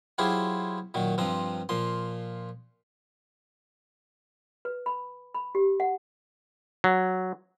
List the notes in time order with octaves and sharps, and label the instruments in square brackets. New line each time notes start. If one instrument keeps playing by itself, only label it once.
[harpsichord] F#3 E4 F4 G4 G#4 C5
A#2 D#3 F#3
G2 F3 C4 A#5
A#2 F3 C6
[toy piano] B4
B5
B5
G4
F#5
[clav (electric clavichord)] F#3